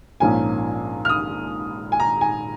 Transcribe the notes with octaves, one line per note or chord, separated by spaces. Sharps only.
A#1 G#2 F3 A#3 C#4 G#5
F6
D#6
G#5
A#5
G#5